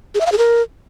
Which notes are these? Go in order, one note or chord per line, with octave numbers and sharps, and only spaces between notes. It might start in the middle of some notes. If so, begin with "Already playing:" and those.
G#4
E5
F5
G#4
A#4